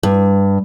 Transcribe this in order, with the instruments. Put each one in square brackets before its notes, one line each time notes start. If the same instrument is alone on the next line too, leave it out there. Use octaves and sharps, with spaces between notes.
[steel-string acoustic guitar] G2